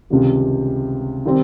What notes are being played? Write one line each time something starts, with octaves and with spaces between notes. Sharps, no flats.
C#2 C3 D#3 G3
D#3 G3 C4